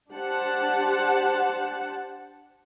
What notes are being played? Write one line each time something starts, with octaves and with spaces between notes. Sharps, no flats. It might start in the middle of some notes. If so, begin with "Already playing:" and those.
D4 G4 C5 F#5 A5